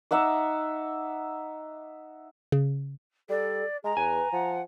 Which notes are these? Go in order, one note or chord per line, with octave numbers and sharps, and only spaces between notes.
D#4 E5 F#5 D6
C#3
G3 A4 D5
G#3 G#4 A#5
E2 B4 G#5
F3 F#5